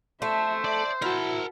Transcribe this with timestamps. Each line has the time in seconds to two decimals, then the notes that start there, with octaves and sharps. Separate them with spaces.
0.22 A3 C5 E5
0.65 D5
1.02 E4 F#4 A#4 A5